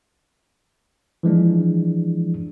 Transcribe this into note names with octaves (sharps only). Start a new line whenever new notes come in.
E3 F3 G#3 D4